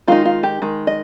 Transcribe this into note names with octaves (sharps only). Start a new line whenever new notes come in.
D#3 G#3 D#4 F4
F4
G4
D#3 G#3
D#5